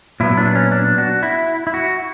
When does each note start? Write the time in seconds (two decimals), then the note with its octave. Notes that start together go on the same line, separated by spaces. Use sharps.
0.20 A#2 F#3 B3 E4
0.37 D4
0.55 C#4
0.72 D4
0.98 F#4
1.23 E4
1.67 E4
1.74 F#4